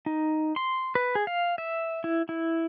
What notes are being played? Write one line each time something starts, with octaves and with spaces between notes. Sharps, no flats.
D#4
C6
B4
G#4
F5
E5
E4
E4